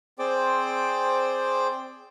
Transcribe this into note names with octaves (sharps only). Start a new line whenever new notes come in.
C4 G#4 C5 D5 G5 D6